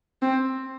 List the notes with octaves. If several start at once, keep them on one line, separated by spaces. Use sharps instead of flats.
C4